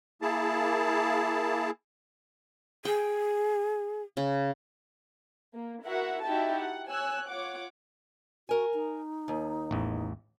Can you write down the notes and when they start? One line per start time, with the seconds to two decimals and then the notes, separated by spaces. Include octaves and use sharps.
0.22 A#3 E4 G#4 A5
2.85 G#4 G5
4.17 C#3
5.53 A#3
5.83 E4 F#4 A#4 E5 F#5
6.24 D#4 E4 F#4 G4 E5 A5
6.59 F#5
6.88 C#5 G#5 E6 F#6
7.29 F4 C#5 F#5 D6
8.49 F#4 A#4 G#5
8.74 D#4
9.28 D#2
9.71 A1 E2